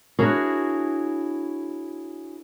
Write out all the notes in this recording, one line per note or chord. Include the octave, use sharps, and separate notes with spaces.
D4 E4 F#4 G#4 A#4 C#5